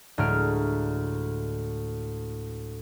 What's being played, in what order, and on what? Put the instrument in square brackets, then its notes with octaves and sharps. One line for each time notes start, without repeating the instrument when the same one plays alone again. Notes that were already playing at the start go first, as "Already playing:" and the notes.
[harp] D2 A2 G#3 A#5 F6 D7